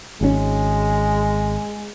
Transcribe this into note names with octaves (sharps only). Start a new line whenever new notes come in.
G#1 B2 G#3 C#4